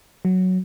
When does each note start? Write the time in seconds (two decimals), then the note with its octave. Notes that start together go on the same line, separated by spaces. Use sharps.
0.25 F#3